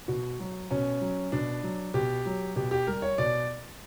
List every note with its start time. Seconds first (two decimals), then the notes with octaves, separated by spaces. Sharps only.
0.08 B2 F#4
0.40 F#3
0.71 B2 C#4
1.01 F#3
1.32 B2 D4
1.63 F#3
1.94 B2 G4
2.26 F#3
2.56 B2 G4
2.71 G4
2.87 G3 A#4
3.02 C#5
3.18 B2 D5